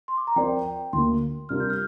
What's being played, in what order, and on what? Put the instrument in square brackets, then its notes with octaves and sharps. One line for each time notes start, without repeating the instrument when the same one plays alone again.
[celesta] C6
D6
A#5
[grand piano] F3 C4 A#4 D5 [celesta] G5
[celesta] G5
[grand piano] D2 D3 A#3 [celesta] C6
[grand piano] C3 G3 D4 F4 A#4 [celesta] F6
[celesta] G6
F6